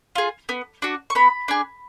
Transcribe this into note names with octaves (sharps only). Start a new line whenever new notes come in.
F4 G#4
B3
D4 F#4
C#6
B3 B5
D4 G#4